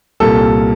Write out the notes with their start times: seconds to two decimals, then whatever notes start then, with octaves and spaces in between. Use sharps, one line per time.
0.20 C2 A#2 G3 A#3 A4